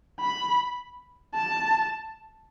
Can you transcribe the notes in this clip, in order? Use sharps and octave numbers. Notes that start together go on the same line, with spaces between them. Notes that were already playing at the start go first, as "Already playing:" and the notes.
B5
A5